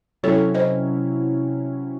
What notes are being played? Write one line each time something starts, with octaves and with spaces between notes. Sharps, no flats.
C3 F#3 C#4 E4 A4 C#5
C5 D#5